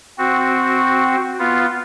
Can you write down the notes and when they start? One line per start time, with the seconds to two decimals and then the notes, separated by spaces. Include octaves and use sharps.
0.18 C4 F#4
1.39 B3 F4